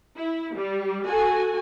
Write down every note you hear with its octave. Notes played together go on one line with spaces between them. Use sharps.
E4
G3
F#4 A4 G#5